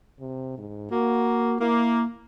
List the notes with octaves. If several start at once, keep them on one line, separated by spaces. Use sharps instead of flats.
C3
G#2
A#3 F#4
A#3 E4